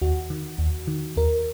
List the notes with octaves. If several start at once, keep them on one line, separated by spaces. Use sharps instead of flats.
D#2 F#4
D#3
D#2
D#3
D#2 A#4